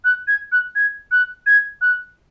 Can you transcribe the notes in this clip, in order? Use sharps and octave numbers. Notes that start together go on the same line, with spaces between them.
F#6
G#6
F#6
G#6
F#6
G#6
F#6